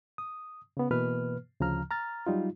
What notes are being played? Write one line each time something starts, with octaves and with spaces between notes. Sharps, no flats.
D#6
C#3 B3
B2 E3 A#3 B4 F6
D2 C#3 F3 A#5 F6
A#5 F6 A6
F#3 G3 D#4 F4